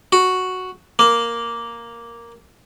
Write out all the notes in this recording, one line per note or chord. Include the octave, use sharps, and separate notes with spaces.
F#4
A#3